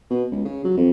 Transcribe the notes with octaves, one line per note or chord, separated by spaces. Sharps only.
B2
C#2
C#3
F#3
F2